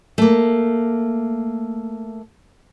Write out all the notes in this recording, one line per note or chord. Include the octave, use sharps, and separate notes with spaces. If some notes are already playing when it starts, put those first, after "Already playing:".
A3 A#3